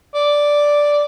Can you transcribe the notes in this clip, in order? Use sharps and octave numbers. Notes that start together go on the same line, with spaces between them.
D5